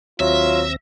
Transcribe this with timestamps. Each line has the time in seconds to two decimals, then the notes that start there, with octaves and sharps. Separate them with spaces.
0.20 D#2 F#3 C4 F4 E5 A#6